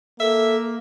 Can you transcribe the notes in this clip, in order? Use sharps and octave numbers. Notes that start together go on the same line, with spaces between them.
A#3 A4 E5